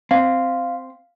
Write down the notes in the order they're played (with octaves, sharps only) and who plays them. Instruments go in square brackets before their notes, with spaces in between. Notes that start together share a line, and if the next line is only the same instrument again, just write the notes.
[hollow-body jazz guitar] C4 [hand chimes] F5